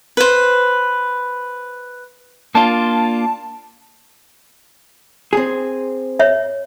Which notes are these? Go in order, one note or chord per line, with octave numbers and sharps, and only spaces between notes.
B4 C5
A#3 D4 F4 A5
C4 G#4
C#5 E5